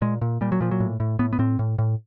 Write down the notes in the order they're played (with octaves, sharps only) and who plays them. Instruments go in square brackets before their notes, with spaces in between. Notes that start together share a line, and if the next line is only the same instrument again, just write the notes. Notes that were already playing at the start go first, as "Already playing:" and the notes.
[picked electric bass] A#2 G#3
A#2
A#2 G3
F#3
A#2 F3
F#3
A2
A2
A2 B3
B3
A2 C4
A2
A2